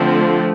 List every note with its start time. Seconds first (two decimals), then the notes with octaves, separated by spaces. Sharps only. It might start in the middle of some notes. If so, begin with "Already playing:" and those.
Already playing: D3 F3 A3 C4